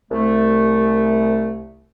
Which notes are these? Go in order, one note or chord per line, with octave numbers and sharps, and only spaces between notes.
C2 A3